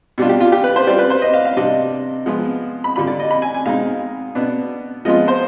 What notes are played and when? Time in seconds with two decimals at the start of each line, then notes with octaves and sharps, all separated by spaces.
0.18 B2 G3 D4 F4
0.29 G4
0.40 F4
0.52 G4
0.64 B4
0.76 C5
0.87 G3 C4 F4 D5
0.99 B4
1.10 C5
1.22 D#5
1.34 F5
1.45 F5
1.57 C3 G3 D4 D#5
2.26 F3 G#3 B3 F4
2.84 B5
2.96 D3 G3 D4 F4 B5
3.07 D5
3.19 D#5
3.31 B5
3.42 G#5
3.54 G#5
3.66 B2 G#3 C4 D#4 F5
4.35 B2 B3 D4
5.05 F3 G#3 B3 F4 D#5
5.28 C5